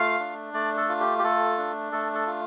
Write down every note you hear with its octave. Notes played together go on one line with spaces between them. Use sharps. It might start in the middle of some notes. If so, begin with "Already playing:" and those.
Already playing: A3 F4 F5
D4
A3 D5
A4
F4
G4
G4
A3 A4
D4
A3 A4
A4
F4